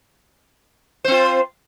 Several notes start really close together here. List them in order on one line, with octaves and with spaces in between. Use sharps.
C5 C4 F4